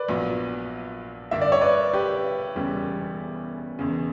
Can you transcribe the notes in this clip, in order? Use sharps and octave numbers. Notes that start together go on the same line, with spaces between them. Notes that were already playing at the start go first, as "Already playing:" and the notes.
Already playing: B4 D5
A#1 A#2 F#3 B3
G2 D3 A#3 D4 E5
D5
C#5
B4 D5
G4 B4
E1 E2 C#3 G3
E1 E2 C#3